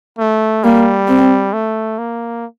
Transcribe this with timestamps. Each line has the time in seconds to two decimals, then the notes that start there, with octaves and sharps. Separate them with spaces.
0.19 A3
0.63 G3 A#3
1.08 C4
1.53 A3
1.98 A#3